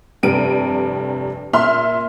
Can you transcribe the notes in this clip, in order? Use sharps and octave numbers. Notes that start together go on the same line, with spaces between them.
F1 G2 C3 D7 D#7
A#2 E5 C6 F6